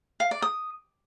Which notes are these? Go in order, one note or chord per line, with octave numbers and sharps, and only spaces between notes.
F5
D5
D#6